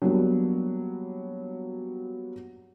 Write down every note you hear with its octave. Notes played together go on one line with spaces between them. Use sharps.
F#3 G3 A#3 B3 D4